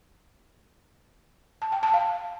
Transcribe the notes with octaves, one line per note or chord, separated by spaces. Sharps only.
A5
G5
A5
F5